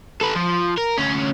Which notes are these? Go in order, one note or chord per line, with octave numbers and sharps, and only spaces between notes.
A4 B4
F3
A#4
D2 C#4